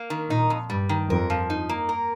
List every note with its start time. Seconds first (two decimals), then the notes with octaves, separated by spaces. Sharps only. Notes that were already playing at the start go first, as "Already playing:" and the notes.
Already playing: A#3
0.10 D#3
0.30 A#2 D#4
0.50 F2
0.70 G2 G3
0.89 D#3
1.09 F2 A#4
1.30 F3
1.50 D#4
1.69 A#3
1.89 A#4